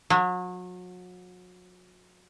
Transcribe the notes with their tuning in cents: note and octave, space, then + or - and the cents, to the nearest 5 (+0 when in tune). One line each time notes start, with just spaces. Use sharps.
F#3 -35